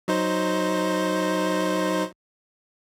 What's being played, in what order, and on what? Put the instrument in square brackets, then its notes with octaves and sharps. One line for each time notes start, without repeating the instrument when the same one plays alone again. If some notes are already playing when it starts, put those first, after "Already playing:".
[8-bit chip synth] F#3 D#4 C5